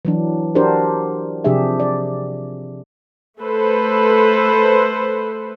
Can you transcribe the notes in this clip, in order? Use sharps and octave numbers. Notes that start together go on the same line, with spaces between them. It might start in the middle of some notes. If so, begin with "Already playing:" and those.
E3 F#3 D4
D4 F#4 G4 A#4 C5 D5
C3 F3 D4 G4 G#4 E5
D5
A3 A4 B4 C5